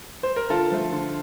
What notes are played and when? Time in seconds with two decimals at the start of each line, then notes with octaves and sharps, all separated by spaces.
0.23 C5
0.36 A#4
0.50 D3 F4 A4
0.72 F3 A3
0.92 D3